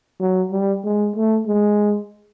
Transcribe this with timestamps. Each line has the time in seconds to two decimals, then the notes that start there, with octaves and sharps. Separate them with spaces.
0.20 F#3
0.52 G3
0.84 G#3
1.16 A3
1.47 G#3